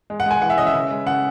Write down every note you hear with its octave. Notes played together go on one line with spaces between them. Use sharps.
G#3
F#5
G#3 G#5
E3 F#5
E5
C#4 D#5
E5
C#3
G#3
C#3 F#5